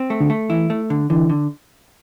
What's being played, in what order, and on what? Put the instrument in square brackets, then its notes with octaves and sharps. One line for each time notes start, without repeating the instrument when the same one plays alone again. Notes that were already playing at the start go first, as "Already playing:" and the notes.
Already playing: [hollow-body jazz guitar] C4
A3
[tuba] D3
[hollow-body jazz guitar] A3
[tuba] E3 [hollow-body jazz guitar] E4
[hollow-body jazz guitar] A3
D3
[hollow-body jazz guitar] D3 [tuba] E3
[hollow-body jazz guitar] D3